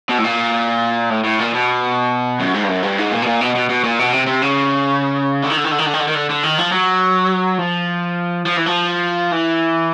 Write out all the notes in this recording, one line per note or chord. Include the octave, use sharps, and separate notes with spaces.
B2
A2
A#2
A2
A2
A#2
B2
F#2
G#2
G2
F#2
G2
G#2
A#2
B2
A#2
B2
B2
B2
A#2
B2
C3
C3
C#3
D3
D#3
D3
D#3
D3
D#3
D3
D#3
D3
D#3
D3
D3
D#3
F3
F#3
F3
F3
E3
F3
E3